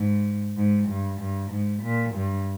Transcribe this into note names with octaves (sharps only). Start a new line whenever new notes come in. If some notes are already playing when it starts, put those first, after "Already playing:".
Already playing: G#2
G#2
G2
G2
G#2
A#2
G2